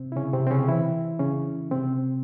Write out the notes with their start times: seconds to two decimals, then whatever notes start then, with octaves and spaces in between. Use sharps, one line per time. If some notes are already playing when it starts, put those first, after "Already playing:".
Already playing: C3 C4
0.12 E4
0.16 C#3 C#4
0.33 C3 C4
0.47 C4
0.51 C#3 C#4
0.68 E3 E4
1.19 C#3 C#4
1.71 C3 C4